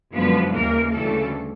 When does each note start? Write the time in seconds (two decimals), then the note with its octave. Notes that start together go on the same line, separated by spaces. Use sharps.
0.15 F#2 D3 F3 G#3 B3 B4
0.54 D#2 C#3 E3 G3 A#3 A#4
0.93 D2 C#3 E3 G3 A3 A4